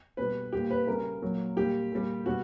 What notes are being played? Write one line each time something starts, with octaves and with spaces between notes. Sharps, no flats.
B2 G3 B4
A#2 G3 G4
B4
C#3 G3 A#4
A#2 F#3
A#2 G3 G4
A#2 G3
B2 G3 F#4